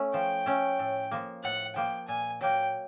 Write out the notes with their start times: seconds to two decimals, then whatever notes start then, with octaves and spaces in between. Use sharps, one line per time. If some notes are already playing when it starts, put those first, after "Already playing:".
Already playing: A3 C#4
0.14 F3 G5
0.46 A3 C#4
0.79 A2
1.11 F3 A#3
1.44 A2 F#5
1.76 F3 A#3 G5
2.08 A#2 G#5
2.41 F#3 A#3 G5